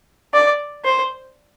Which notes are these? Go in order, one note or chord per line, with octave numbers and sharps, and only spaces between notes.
D5
C5